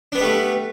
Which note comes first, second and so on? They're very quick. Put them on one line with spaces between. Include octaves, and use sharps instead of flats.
D4 B3 B4 G3 A3